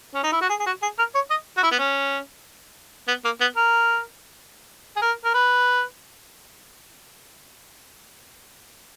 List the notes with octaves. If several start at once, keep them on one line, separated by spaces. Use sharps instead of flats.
C#4
D#4
E4
F#4
G#4
G#4
F#4
G#4
A#4
C#5
D#5
F#4
E4
B3
C#4
B3
A#3
B3
A#4
G#4
A#4
A#4
B4